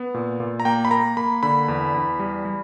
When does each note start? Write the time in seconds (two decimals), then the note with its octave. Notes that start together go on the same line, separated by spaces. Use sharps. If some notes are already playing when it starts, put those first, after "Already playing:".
Already playing: B3
0.14 A#2
0.40 A#2
0.60 A#5
0.65 A#3 G5
0.85 B5
0.91 A#3 A#5
1.17 A#3 B5
1.43 D3 B5
1.68 E2
1.94 E2
2.19 G3
2.45 G3